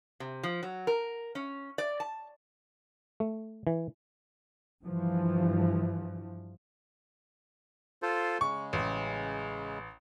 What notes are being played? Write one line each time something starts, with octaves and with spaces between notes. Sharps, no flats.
C3
F3
F#3
A#4
C#4
D5
A5
A3
E3
G2 E3 F3
F4 A4 C5
C#3 G#3 C#6
A1